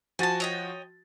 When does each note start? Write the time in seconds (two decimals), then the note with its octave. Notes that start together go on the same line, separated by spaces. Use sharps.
0.19 F3 F#4 G#5 A5 A6
0.40 C#5 D#5 G5